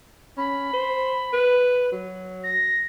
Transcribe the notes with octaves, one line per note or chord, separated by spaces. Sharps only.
C#4 B5
C5
B4
F#3
A#6